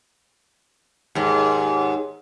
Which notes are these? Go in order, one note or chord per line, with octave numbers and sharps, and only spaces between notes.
D#2 G#2